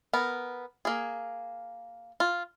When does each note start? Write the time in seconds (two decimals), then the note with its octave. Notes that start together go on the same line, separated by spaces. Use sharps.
0.13 B3 A#4
0.85 A#3 G#4
2.20 F4